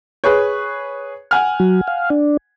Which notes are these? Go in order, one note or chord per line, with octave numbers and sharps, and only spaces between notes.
G#4 B4 C#5
F#5 G#5 F6
F#3
F5
D4